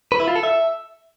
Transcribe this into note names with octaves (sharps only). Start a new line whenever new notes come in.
B4
E4
F4
A4
E5